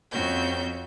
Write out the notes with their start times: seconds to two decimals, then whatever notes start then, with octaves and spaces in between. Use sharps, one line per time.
0.11 F2 C4 C#4 F#4 G6